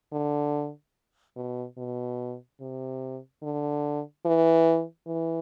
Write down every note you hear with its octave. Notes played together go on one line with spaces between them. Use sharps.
D3
B2
B2
C3
D3
E3
E3